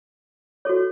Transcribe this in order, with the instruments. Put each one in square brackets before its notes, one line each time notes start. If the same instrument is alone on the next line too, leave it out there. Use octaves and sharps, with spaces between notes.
[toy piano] F#4 A4 C#5